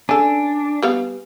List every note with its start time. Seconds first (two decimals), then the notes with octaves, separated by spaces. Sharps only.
0.09 C#4 D4 A4 G#5
0.82 G3 B3 F5